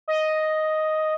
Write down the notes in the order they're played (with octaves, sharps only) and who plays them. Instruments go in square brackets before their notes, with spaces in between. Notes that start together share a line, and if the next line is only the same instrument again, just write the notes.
[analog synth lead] D#5